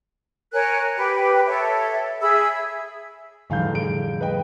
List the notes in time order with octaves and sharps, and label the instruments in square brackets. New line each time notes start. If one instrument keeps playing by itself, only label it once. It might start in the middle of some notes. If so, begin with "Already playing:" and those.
[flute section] A#4 C#5 G#5 F#6
G4 B4 G5
A4 C#5 E5
G#4 E5 B5 E6
[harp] F1 A2 [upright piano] E2 F5 G6 [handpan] D3 G3
[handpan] G#4 [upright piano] D7
[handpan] G3 [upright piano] B4 D#5 G5